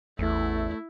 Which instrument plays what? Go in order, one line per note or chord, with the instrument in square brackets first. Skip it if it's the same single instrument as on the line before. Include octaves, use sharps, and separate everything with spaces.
[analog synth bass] A1 [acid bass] E2 [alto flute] A3 [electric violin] E4